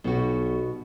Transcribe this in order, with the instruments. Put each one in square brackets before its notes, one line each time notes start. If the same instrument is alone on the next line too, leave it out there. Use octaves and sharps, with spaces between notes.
[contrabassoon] B1 [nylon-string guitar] B2 G3 F#4